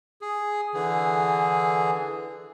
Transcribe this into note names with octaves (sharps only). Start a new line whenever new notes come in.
G#4
D3 E3 G#4